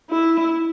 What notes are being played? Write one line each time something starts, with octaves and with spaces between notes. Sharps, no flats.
E4